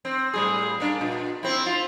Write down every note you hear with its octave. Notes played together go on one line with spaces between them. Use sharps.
C4
A2 G3 G#4
A#3 D4
A#2
C4 E4
F4